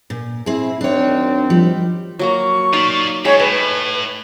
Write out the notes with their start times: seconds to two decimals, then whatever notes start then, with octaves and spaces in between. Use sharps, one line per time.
0.10 A#2
0.46 C4 E4 G#4
0.81 F#2 D#3 C4 D4 C#5
1.50 F3 G3
2.19 F#3 A#3 A#5 C#6
2.73 D#4 F4 D5
3.25 F#2 G#3 C#5 G5 B5
3.39 A2 B4 A5